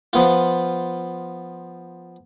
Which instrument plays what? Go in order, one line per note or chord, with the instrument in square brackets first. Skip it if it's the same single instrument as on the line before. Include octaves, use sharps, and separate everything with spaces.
[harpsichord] F3 B3 F4